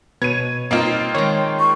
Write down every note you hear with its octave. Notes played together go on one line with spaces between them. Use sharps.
B2 B4 C#5 G#6 D#7
G3 A#3 C4 D#4 F4
D#3 G#3 C#5 C6
C#6